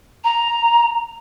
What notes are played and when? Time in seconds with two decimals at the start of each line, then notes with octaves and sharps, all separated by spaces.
0.24 A#5